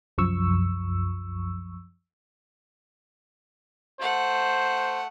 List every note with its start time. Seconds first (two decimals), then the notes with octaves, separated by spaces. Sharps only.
0.18 C2 F#2 F3 C#6 E6
4.00 A3 C5 F#5